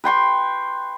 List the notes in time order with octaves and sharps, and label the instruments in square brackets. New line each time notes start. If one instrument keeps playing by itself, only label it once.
[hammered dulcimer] B4 G5 C6 C#6